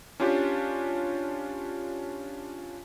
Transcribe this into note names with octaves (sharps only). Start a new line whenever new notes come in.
C#4 D4 F4 G4